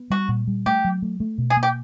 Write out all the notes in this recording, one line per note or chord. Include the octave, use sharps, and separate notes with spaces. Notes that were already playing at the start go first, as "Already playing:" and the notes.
Already playing: B3
G3 F#4
A#2
G3
A3 G4
F#3
A3
A3
B2
G#4
A#3
G4